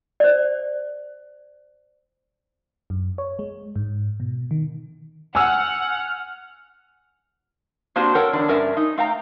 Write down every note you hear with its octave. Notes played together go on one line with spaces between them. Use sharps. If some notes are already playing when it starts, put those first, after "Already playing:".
C5 D5
F#2
C#5
G#3
G#2
B2
D#3
F#5 G#5 E6 F6
A#3 C4 D4 F#4 G4 C5
A4 A#4 C#5 F#5 G5
E2 D3 D4
G2 C#4 A#4 D5 E5
D#4
A3 F5 G5 A#5